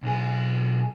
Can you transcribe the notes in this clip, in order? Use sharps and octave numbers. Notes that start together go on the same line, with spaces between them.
B1 G#4